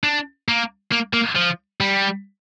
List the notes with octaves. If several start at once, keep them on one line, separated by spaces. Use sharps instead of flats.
D4
A#3
A#3
A#3
F3
G3